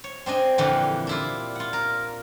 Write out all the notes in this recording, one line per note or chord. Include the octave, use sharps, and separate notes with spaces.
C#5
C4 D4 D#5 G#5
F2 A#2 D3 E3 G4
D4 E4 F4
F4 F#5
A#4